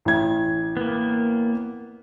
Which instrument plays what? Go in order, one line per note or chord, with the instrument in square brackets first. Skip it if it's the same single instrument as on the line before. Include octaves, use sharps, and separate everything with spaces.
[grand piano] A1 G#6
[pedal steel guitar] A#3 B3